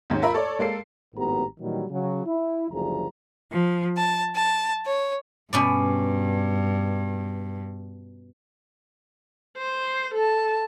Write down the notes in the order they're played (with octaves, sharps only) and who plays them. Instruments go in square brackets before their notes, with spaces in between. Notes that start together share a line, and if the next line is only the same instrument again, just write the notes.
[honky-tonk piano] D#2 G#2 C#4
F4 A#4 E5 A#5 B5
A4 C#5 D5
G#3 A#3 A4 C7
[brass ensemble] G#1 F#2 A2 B3 G4 A#5
A#2 D#3 E3 F#3 G3
C#3 F#3
E4
F#1 D2 F3 G3 G#4 A#5
[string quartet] F3
A5
A5
C#5
[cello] G2 [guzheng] B2 C#4 D5
[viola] C5
A4 A5